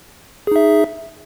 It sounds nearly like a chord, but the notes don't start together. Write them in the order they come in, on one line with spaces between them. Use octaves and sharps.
G#4 D#4 E5